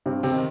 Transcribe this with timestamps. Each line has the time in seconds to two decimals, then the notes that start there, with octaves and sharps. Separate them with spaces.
0.06 G2 C3 C4
0.23 C3 C4
0.32 D#3